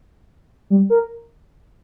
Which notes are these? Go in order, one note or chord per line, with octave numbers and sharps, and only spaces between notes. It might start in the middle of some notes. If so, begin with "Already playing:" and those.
G3
A#4